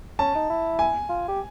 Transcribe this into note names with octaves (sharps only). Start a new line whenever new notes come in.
C#4 A5
D#4
E4
G#5
F4
G4